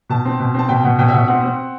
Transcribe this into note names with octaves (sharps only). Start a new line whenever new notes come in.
B2 A5
C4
B2
C4 A5
B2 G5
B2 F#5
B2 G5
E5
B2 F#5
E5
C4 F#5
C4